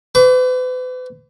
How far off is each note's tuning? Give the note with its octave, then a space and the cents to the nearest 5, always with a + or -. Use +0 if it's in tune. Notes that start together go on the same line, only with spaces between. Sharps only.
B4 +40 D6 -35